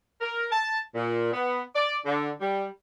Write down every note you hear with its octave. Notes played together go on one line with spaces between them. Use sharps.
A#4
A5
A#2
B3
D5
D3
G3